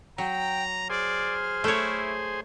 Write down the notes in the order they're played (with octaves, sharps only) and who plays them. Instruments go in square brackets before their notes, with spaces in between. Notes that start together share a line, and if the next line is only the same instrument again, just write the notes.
[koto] F#3 [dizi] G5 [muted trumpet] A#5
[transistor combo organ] G#4 C5 [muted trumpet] D5 [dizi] F6
[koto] A3 C#5 [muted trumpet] E4